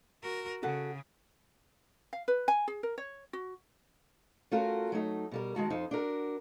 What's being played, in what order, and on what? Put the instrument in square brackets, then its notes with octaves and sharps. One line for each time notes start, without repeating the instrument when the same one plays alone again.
[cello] F#4 A#4
[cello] C#3 [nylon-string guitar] F#4 A4 F#5
[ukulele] F5
B4
G#5
G#4
A#4
C#5
F#4
[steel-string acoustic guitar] A3 C#4 F4 F#4 A#4
F#3 A3 D#4
B2 G3 A#4
D#3 G#3 F#4 A5
F2 D#4 C5
D4 F#4 A#4